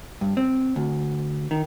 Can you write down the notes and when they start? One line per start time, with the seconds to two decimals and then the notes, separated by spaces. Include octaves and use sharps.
0.21 G2
0.37 C4
0.76 D2
1.51 D#3